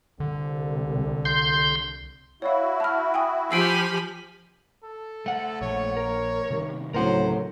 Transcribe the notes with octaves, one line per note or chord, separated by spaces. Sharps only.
C2 D3
C6 G6
E4 F#4 C#5 D5 F5
A5 F6
G5 G#5 D#6
F3 G4 G#5 B5 E6 C7 D7
A4
A3 F#5
A#1 C#5
A#4
C3 D#3 G3
D2 A2 C#3 F#3 C4 A#4 C5 F#5